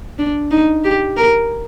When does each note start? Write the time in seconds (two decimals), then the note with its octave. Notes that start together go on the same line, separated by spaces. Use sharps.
0.19 D4
0.51 D#4
0.84 G4
1.17 A#4